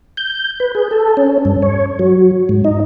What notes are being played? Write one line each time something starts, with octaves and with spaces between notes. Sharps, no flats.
G6
B4
G#4
A4
C#4
G2
C#5
F#3
G#2
D#4